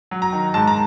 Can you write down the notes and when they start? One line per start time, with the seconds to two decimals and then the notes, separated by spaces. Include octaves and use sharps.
0.11 F#3
0.22 A#5
0.32 D#3
0.54 G#2 A5
0.67 A#5